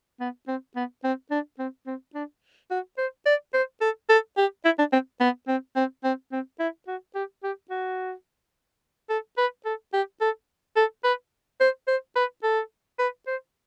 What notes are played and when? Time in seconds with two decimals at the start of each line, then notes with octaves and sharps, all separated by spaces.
0.20 B3
0.47 C4
0.76 B3
1.04 C4
1.31 D4
1.59 C4
1.86 C4
2.15 D4
2.71 F#4
2.98 C5
3.26 D5
3.54 C5
3.81 A4
4.09 A4
4.37 G4
4.65 E4
4.79 D4
4.93 C4
5.20 B3
5.48 C4
5.76 C4
6.04 C4
6.32 C4
6.59 E4
6.87 F#4
7.15 G4
7.43 G4
7.70 F#4
9.09 A4
9.37 B4
9.65 A4
9.93 G4
10.21 A4
10.76 A4
11.04 B4
11.60 C5
11.88 C5
12.16 B4
12.43 A4
12.99 B4
13.27 C5